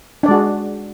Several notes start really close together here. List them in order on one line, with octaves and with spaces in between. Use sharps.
D4 D5 G#3 F#4 G#4